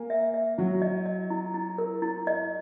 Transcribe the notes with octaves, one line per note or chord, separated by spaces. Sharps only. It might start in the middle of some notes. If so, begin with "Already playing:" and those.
Already playing: A#3 G#5
E5
E5
F#3 E4
D#5
D#5
E4
E4
A#4
E4
D#5